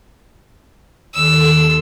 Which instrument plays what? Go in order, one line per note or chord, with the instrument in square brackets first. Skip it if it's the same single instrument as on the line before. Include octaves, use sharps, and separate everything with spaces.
[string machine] D#2 A4 C6 [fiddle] E6